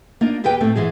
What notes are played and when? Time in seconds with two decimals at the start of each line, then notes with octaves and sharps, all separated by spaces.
0.21 A#3 D4 D#4 F4
0.44 D#2 G4 G#4 B4 G5
0.61 A2 A3 C4
0.75 G#2 E3 G#3 G#4